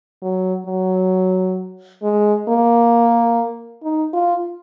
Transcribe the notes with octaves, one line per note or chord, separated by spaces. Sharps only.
F#3
F#3
G#3
A#3
D#4
F4